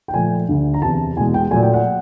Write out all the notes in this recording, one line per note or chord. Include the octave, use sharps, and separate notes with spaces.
G5
A#2 F3 A3 G#5
D2 D3 G3
A#5
E2 C3 E3 A5
E2 B2 G#3 G#5
G5
A#2 F#3 A3 G#5
G5
F#5